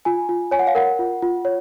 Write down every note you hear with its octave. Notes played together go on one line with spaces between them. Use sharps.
F4 G#5
F4
C#5 G#5
F#5
F5
A#4 F#5
F4
F4
C#5